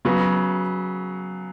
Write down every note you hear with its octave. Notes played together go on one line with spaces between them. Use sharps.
C#3 F#3 B3